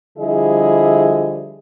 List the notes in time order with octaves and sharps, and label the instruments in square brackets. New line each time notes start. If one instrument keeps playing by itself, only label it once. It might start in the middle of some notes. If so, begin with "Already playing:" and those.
[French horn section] D3 F3 G3 E4 G#4 D#5